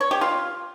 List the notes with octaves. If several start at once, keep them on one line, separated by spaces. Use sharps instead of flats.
C#5
G4
F4